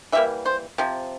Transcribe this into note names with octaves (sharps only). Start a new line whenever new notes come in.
E3 G3 A#3 E5
C5
C3 F3